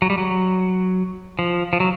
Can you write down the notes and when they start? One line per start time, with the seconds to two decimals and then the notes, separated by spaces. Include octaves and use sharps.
0.02 F#3
0.10 G3
0.18 F#3
1.39 F3
1.73 F3
1.80 F#3